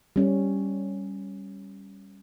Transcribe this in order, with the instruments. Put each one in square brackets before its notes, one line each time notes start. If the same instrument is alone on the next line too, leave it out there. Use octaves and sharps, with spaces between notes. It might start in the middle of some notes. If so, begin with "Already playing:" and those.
[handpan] G3 C#4